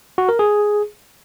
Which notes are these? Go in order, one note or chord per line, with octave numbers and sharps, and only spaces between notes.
F#4
A#4
G#4